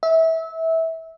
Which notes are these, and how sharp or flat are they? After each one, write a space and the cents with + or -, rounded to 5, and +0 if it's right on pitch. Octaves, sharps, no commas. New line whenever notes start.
E5 -20